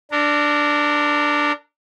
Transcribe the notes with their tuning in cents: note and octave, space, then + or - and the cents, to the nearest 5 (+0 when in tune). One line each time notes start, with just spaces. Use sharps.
D4 +0 A#4 -25